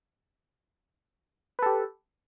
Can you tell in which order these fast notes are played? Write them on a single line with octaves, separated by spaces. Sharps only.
B4 A4 G4